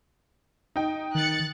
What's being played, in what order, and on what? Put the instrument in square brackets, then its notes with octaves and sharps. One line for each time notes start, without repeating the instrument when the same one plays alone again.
[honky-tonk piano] D#4 G5
[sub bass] D#3 [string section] F#6 A6 C#7